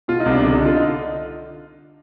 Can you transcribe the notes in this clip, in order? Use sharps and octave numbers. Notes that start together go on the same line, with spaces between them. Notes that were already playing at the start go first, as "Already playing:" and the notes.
B2 F4
D#4
C2
D4
D3 D#4
D3
F4
D#4